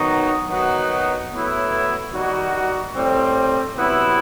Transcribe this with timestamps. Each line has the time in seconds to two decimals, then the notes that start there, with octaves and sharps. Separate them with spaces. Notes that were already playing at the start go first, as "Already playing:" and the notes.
Already playing: D#3 F#3 B3 D#4 F#4
0.48 D#3 F#3 B3 D#4 F#4
1.30 A2 F#3 B3 E4
2.12 D#3 G3 D#4 F#4
2.94 A2 G3 C4
3.76 C3 F#3 B3 E4